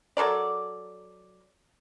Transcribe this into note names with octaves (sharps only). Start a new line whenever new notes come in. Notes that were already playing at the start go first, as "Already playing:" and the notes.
F#3 A4 A#4 D5